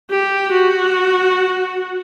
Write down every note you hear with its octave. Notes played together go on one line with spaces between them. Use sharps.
G4
F#4